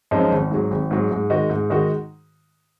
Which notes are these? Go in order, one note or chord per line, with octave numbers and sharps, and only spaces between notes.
F#2 F3 G#3 D#4
G#1
G#2 F#3
G#1
G#2 F#3
G#2
D#3 G#3 D#4 F#4
G#2
D#3 G#3 D#4 F#4